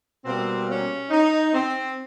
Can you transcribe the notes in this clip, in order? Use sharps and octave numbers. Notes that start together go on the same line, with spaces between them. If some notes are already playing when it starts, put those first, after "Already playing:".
B2 G3 A#3 C4
C#4
D#4
C4